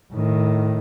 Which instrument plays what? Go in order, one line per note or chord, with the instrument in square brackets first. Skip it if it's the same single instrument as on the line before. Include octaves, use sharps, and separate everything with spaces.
[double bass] A2 D#3